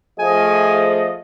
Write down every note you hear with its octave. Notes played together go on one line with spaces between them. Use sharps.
F3 A3 G#4 D#5 G#5